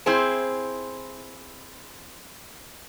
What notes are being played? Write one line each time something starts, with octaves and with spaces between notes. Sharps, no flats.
C4 E4 G#4 C5